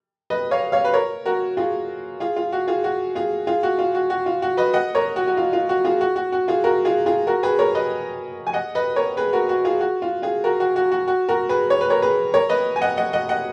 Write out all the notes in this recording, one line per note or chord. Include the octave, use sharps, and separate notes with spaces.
B4 D#5
C#5 F5
C#5 F5
B4
A#4 C#5
F#4 A#4
F4 G#4
F4 G#4
F4
F#4
F4 G#4
F#4
F4 G#4
F4 G#4
F#4
F4
F#4
F#4
F4
F#4
B4 D#5
D#5 F#5
A#4 C#5
F#4
F#4
F4
F4
F#4
F4 G#4
F#4
F#4
F#4
F4 G#4
F#4 A#4
F4 G#4
F4 G#4
F#4 A#4
G#4 B4
A#4 C#5
B4 D#5
G#5
D#5 F#5
B4 D#5
A#4 C#5
G#4 B4
F#4 A#4
F#4
F4 G#4
F#4
F4
F4 G#4
F#4 A#4
F#4
F#4
F#4
F#4
F#4 A#4
G#4 B4
C#5
B4
A#4 C#5
G#4 B4
A#4 C#5
B4 D#5
G#5
D#5 F#5
D#5 F#5
D#5 F#5
D#5 F#5